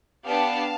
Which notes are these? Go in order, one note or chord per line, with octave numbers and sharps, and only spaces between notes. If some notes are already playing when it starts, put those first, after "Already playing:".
B3 D4 G4 F5 A5